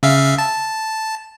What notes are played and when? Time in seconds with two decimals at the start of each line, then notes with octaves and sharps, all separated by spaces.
0.03 C#3 E5 F5
0.38 A5